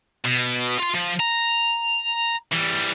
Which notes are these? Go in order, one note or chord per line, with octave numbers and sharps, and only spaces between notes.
B2
F4 C6
F3
A#5
E3 G3